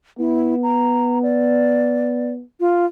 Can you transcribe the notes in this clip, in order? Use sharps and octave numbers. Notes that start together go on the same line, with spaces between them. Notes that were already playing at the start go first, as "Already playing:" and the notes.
B3 E4
A#5
D5
F4